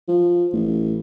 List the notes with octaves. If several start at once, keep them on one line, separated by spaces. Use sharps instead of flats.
F3
A1